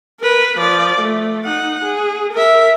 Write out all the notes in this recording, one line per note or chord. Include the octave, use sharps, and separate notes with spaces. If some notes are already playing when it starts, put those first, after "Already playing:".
A#4 B4
F3 D5
A3
D#4 F#5
G#4
A#4 E5